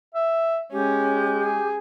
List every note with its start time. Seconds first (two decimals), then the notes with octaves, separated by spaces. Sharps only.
0.15 E5
0.72 G#3 C#4 G4
1.42 G#4